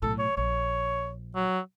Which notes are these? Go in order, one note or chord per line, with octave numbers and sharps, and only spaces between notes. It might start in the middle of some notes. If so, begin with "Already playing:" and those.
B1 A2 A4
C#5
A#1 C#5
F#3